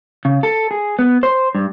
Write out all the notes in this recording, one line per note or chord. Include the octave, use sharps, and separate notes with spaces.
C#3
A4
G#4
B3
C5
G2